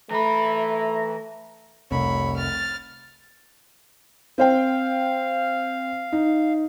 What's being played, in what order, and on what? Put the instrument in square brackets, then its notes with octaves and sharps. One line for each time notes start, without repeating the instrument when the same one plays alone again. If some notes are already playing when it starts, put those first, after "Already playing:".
[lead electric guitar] E3 B5 [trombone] A3 [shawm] A#5
[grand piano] F1 C2 [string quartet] C#5 B5
[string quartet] F6 A6
[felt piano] C4 C5 G5 [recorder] F5
[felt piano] D#4